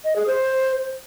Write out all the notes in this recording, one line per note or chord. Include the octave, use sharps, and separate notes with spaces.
D#5
G#4
C5